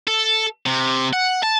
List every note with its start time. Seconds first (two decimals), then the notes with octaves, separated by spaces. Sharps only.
0.07 A4
0.66 C3
1.13 F#5
1.43 A5